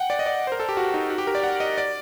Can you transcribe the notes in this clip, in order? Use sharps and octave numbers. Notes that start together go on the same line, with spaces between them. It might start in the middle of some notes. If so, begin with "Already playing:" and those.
Already playing: F#5 G5
D5
D#5
D5
C5
A#4
A4
G4
F#4
D#4
F#4
G4
A#4
D5
F#5
D#5
D5